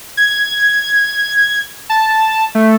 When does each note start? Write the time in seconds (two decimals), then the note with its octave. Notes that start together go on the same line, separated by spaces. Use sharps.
0.17 G#6
1.90 A5
2.55 A3